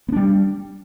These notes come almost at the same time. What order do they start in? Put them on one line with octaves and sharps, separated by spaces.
B3 D4 G3